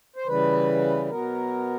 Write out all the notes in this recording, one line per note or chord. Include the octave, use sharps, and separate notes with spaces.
C5
C#3 E3 G3 B4
B4
B2 F#3 B3 A#4